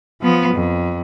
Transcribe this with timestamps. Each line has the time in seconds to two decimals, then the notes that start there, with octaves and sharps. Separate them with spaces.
0.22 F3 B3
0.54 F2